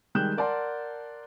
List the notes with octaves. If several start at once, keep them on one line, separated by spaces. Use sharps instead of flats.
D#3 G3 G#3 F#6 G6 E7
A#4 D5 F#5 A5 C6